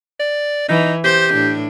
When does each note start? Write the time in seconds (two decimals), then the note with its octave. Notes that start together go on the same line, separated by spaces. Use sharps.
0.20 D5
0.69 E3 D#4
1.04 G4 C5
1.33 A2 D4